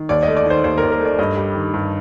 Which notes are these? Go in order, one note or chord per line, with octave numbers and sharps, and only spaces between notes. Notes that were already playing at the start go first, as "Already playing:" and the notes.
Already playing: D#3
D#2 D5
A3 D#5
D5
D#3 C5
D#2 C5
D#2 A#4
A#4
A3 D5
G2 D#5
G3
D#3
G2